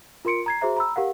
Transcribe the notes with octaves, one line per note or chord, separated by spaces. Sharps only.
F4 A#4 C6 C#7 D7
A#5 G#6 C7
F#4 G#4 C5 E5 A#5
A#5 B5 E6
G4 A#4 F5 F#5